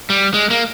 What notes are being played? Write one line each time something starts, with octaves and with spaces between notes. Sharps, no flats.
G3
G#3
A#3